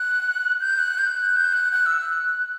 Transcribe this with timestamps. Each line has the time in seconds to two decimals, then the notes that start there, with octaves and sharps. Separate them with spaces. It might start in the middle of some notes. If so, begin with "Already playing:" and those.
Already playing: F#6
0.60 G6
0.79 F#6
0.98 G6
1.17 F#6
1.36 G6
1.54 F#6
1.72 F#6
1.86 E6
2.01 F#6